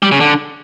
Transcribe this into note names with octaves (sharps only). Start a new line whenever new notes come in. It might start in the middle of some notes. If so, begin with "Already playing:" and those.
G3
C#3
D3